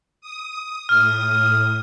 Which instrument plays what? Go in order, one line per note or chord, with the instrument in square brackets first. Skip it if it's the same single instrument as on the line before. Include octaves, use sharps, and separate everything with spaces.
[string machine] D#6
[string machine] A2 D#6 [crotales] F6